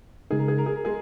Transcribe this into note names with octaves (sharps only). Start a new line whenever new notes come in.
C#3 G#3 D#4 G#4
A#4
G#4
A#4
G#4
A#4
G#3 G#4